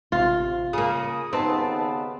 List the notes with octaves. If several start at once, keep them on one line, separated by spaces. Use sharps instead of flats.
A1 C3 F4
C#3 A#3 D#6
D#2 C#3 B3 C4 D#4 B4 A5